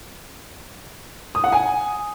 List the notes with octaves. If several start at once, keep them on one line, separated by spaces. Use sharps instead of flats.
D#6
F#5
G#5